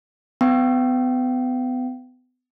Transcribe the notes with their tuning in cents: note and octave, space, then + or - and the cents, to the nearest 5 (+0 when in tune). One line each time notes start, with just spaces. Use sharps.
B3 +35 G5 -25